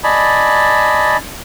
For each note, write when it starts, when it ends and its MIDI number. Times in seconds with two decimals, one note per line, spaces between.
0.04 1.17 74
0.04 1.17 75
0.04 1.17 80
0.04 1.17 81
0.04 1.17 83